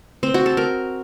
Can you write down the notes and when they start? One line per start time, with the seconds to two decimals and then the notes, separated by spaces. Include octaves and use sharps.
0.23 C4
0.34 F#4
0.46 A4
0.57 A#4